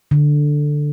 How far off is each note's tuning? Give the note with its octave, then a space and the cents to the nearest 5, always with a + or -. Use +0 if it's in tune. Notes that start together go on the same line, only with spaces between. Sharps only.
D3 +5